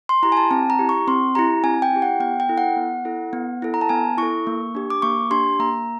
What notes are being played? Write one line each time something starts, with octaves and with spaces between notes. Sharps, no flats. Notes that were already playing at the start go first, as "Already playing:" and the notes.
C6
E4 G4 A#5
G#5
A5
C4 A5
A#5
E4 G4
C#6
C4 C6
E4 G4 A#5
C4 G#5
G5
E4 G4
F#5
B3 G5
G5
E4 A4
F#5
B3
E4 A4
B3
E4 A4
A#5
A5
B3 G#5
E4 A4 C#6
A#3
D4 G4
D6
A#3 C#6
D4 G4 C6
A#3 A#5